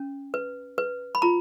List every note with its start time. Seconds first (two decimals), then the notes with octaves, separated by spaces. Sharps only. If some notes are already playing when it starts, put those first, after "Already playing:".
Already playing: C#4
0.34 B4
0.78 B4
1.15 B5
1.22 F4 A#5